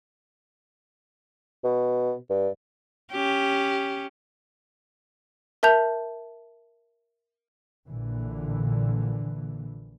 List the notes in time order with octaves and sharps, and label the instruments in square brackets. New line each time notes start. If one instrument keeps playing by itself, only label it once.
[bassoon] B2
G2
[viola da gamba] C#4 G4
[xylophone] A#4 E5 A5 G6 F7
[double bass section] A#1 A#2 D3 E3